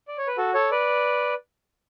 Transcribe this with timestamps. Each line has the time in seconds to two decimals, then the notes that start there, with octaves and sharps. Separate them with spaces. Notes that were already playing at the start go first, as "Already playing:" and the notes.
0.08 D5
0.18 C#5
0.27 B4
0.37 F#4 A4
0.54 A4 C#5
0.71 B4 D5